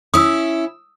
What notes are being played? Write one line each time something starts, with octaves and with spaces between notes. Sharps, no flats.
C#4 E4 D#6 E6